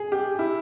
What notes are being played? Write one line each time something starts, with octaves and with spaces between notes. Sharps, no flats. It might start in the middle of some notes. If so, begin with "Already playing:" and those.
Already playing: G#4
G4
E4